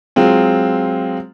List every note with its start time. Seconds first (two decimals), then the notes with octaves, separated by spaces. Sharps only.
0.16 F#3 G#3 C4 F4